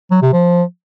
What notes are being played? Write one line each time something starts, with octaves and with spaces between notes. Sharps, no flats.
F#3
C3
F3